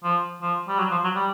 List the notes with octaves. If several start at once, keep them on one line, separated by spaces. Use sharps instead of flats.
F3
F3
G3
F#3
F3
F#3
G3